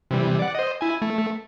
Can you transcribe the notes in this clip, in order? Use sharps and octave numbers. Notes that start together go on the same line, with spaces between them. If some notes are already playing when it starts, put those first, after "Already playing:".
C3 E3 G3
D5 F#5
C5 D#5
E4 G#5
A3